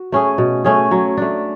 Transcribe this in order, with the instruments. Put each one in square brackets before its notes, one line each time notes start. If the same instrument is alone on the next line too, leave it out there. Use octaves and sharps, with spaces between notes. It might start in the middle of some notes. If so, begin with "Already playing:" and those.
Already playing: [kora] F#4
A3 C#4 G#4
B2
A3 C#4 G#4
F#3
A3 D4